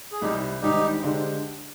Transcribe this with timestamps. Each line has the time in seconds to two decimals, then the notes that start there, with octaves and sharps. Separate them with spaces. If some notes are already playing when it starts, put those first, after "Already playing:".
0.12 G#4
0.22 C2 C3 G3 C4 D#4 G4
0.62 G#1 G#2 G3 D4 D#4 G4
1.03 D3 G#3 D4 G4 C5